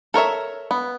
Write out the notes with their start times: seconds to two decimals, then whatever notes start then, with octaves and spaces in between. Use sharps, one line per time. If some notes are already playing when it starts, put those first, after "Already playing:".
0.14 A4 A#4 C#5 E5
0.71 B3